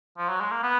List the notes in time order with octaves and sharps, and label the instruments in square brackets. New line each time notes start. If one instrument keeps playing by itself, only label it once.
[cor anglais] F3
F#3
G#3
A#3
B3